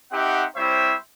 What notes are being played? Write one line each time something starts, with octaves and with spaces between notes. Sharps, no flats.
C4 D#4 G4 E5 F#5
G3 C4 E4 C5 C#5 E5